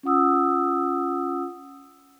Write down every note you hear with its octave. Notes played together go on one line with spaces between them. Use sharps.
C#4 F4 F#5 D#6 E6